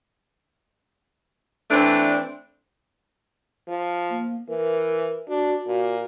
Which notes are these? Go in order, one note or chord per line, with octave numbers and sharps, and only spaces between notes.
E3 A3 C4 D4
F3
A#3
E3 A#4
D4 F#4
A#2 F#4